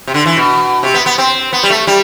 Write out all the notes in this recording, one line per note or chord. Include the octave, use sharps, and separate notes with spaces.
C3
D3
E3
B2
C3
B3
B3
C4
B3
G3
A3
G3